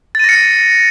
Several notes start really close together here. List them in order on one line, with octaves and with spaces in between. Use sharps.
A6 D#7 A#6 C#7